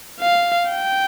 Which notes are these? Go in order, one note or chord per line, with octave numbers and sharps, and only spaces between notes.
F5
G5